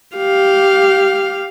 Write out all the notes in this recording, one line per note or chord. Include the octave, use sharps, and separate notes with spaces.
G4 F5